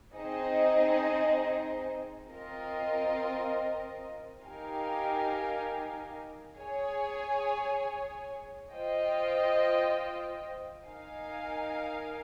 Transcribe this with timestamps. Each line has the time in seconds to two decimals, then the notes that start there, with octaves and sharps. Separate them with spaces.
0.15 C4 D#4 G#4 C5 D#5
2.30 C4 F4 A#4 D#5
4.43 D#4 G4 A#4 F5 G#5
6.58 G#4 C#5 G#5
8.71 F4 C5 D#5 G5
10.84 D#4 A#4 F5 G#5